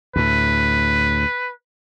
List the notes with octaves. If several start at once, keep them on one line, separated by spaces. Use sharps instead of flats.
D2 A2 B4